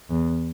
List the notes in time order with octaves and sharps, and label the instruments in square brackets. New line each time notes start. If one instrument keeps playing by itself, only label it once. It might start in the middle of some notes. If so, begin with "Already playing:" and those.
[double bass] E2